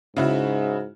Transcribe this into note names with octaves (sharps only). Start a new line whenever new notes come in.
G#2 C#3 E4 F#4